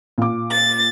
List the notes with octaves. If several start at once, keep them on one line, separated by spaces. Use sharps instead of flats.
A#2 D6
A6